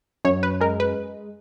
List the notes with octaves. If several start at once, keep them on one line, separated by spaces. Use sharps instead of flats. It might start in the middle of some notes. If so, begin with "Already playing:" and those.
F#2 C#5
B4
G#3 A#4
B4